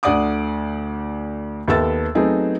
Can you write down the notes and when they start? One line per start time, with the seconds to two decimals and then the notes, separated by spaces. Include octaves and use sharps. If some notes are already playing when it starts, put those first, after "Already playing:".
0.03 D2 D3 D5 F#5 D6 D#6
1.68 D#2 B3 A4 E5 E6 A6
2.15 F#3 A3 B3 C4 D#4 G#4